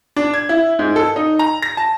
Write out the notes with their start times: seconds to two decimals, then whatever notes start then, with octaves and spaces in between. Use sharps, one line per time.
0.16 D4
0.34 G#6
0.49 E4
0.79 G#2
0.96 A4
1.16 D#4
1.39 A#5
1.62 A#6
1.77 A5